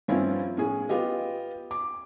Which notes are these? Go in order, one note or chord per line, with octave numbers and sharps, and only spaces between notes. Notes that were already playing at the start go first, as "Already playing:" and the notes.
G2 F3 C4 C#4 E4 F4
A2 C#4 G#4
B3 F4 G4 D#5
D6